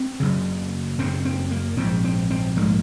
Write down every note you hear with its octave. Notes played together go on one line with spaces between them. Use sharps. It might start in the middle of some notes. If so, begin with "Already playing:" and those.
Already playing: C4
F#1 F#2 C#3
F#1 F#2 C#3 C4
C4
A#3
A#1 G#2 C4
C4
C4
A#1 G#2 A#3